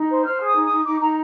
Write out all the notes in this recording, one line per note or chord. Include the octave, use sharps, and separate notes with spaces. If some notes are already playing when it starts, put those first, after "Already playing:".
Already playing: D#4
C5
C5 F6
G#4
D#6
D#4
D#6
D#4
D#4 D6
D#4 A#5